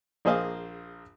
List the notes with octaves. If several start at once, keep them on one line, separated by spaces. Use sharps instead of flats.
A#1 A#3 G#4 C5 D#5 F5